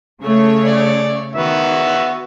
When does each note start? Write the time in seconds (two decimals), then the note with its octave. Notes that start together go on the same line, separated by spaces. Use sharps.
0.22 C#3 A3 C#5
0.66 D5
1.35 D#3 B3 F#4 E5